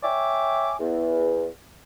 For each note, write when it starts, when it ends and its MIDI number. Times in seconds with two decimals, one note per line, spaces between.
0.03 0.73 73
0.03 0.73 76
0.03 0.73 79
0.03 0.73 80
0.03 0.73 86
0.80 1.47 40